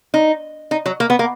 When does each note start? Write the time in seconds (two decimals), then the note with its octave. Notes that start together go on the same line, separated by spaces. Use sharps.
0.14 D#4
0.71 D#4
0.86 F#3
1.00 A#3
1.10 B3
1.19 A#3